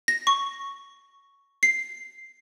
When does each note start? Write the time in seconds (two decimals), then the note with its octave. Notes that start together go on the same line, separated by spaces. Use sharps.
0.08 A#6
0.27 C#6
1.63 C7